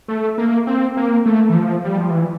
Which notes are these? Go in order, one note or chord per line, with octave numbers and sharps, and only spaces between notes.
A3
A#3
C4
A#3
A3
E3
F3
G3
F3
E3